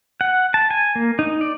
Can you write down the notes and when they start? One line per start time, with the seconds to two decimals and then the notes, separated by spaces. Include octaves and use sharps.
0.21 F#5
0.54 A5
0.71 G#5
0.95 A#3
1.19 D#4
1.41 D5